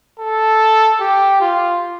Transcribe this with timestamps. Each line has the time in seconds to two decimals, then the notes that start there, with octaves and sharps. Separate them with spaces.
0.20 A4
1.00 G4
1.41 F4